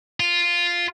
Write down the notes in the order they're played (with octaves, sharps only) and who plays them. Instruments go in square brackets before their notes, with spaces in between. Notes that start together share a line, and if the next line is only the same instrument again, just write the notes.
[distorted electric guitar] F4